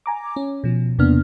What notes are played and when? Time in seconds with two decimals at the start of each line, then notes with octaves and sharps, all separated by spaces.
0.06 G#5 A#5 D6
0.36 C#4
0.64 B2 F3
0.98 E2 C3 A#3 B3 D4 F6